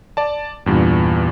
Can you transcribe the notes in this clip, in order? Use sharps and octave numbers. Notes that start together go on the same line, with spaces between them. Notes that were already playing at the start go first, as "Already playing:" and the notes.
D5 A5
E2 G2 A#2